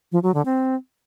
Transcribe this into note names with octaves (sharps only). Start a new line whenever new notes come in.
F3
F#3
D3
C4